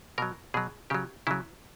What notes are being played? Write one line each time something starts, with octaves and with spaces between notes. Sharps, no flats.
B2 F#3 A#4
B2 F#3 G#4
C#3 F#3 G4
C#3 F#3 E4